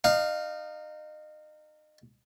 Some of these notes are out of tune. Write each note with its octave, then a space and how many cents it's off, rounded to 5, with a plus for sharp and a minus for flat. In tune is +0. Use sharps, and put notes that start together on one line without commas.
D#4 -30 F5 +0